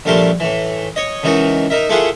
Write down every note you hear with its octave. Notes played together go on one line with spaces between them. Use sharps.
A#1 G3 A3 A#4 A5 C6
A2 E3
C#5 D#5
C#2 E3 D#4 F#4 A#4
D#4 A#4 E5
A3 A#3 E4 F4 G#4 F#5